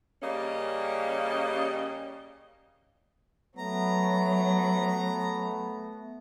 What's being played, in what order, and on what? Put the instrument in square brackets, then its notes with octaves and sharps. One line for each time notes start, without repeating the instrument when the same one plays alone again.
[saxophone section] C#3 G3 A#3 C#4 D#5
[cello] F#3 [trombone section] A3 B3 [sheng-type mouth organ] A#5